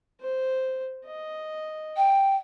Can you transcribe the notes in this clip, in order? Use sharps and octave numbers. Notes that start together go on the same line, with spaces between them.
C5
D#5
G5